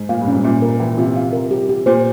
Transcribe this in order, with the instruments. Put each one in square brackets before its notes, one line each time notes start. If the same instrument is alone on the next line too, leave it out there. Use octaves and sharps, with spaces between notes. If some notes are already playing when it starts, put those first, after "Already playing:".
Already playing: [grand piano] G#2
[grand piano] A#2 [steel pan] F5
[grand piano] G2
[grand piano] G#2 [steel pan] C#4
[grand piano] A#2 [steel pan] E5
[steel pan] A#4
[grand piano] E3 [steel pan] G5
[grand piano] C3 [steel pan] F4
[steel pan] F5
A#4
G4
G4
[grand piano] A#2 [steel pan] C5